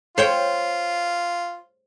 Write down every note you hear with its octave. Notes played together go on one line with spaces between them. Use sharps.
F4 C5 C#5 G5